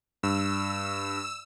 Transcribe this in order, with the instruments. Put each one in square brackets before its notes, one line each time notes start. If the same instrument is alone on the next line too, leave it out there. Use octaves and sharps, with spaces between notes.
[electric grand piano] G2 [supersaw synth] E6